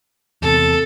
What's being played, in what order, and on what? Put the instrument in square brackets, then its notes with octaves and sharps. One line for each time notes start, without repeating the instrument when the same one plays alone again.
[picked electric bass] E2 C3 [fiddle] A4